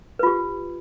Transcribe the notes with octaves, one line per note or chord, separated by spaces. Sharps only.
F4 G4 B4